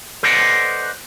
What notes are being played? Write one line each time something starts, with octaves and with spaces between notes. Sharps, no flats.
A4 B4 C5 D5 D#5 F#5